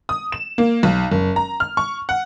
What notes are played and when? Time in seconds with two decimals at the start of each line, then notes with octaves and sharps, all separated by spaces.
0.09 D#6
0.32 E7
0.58 A#3
0.83 B1
1.12 F#1
1.36 A#5
1.60 F6
1.77 C#6
2.09 F#5